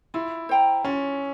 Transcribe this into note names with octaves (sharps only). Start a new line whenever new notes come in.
E4 F4
C5 G5 A#5
C#4 F4